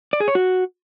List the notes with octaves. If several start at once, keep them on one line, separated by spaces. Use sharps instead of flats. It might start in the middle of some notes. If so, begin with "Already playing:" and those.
D5
G#4
C#5
F#4